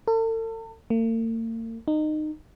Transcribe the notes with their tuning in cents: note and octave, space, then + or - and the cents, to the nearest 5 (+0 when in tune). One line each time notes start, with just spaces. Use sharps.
A4 +40
A#3 -45
D#4 -25